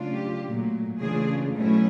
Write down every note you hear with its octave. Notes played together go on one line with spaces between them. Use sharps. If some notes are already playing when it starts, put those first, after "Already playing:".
Already playing: C#3 F#3 A3 D4 F4
G4
A#2 F#3 A3
C#3 E3 A3 D4 F4 G#4
B2 F#3 A3 C#4 E4